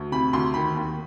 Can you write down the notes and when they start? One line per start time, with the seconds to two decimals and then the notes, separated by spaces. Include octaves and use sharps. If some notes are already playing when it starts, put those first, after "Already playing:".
Already playing: D2
0.12 C3 B5
0.33 D2 C6
0.54 D#3 B5
0.75 D#2